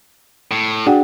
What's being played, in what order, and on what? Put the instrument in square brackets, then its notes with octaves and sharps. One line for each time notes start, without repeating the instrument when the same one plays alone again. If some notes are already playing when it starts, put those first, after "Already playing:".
[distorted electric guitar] A2
[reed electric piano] D4 G#4 [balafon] F#4 F#5 G5